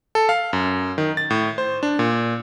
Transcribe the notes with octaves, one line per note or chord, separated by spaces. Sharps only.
A4
F5
F#2
D#3
A6
A2
C5
D4
A#2